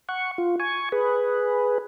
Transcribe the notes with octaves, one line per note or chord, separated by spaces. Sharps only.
F#5 C#6
F4
G#5 C#6
G#4 B4